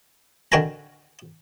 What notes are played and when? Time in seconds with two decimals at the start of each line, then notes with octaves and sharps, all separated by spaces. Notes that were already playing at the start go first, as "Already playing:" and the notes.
0.52 D3 D#3 F#4 G5 G#5 A#5